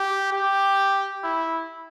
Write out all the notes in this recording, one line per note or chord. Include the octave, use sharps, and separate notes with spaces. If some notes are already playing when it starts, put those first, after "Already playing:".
Already playing: G4
G4
E4